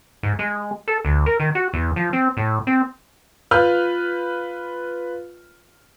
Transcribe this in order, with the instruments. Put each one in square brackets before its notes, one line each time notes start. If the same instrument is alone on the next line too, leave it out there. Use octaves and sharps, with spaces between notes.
[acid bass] G#2
G#3
A4
D2
A#4
D#3
F#4
E2
F3
C4
A2
C4
[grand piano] F4 B4 F6 G6